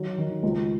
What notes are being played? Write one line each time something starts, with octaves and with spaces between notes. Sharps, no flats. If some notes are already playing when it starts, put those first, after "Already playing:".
Already playing: D#3 F#3
D#3
C#2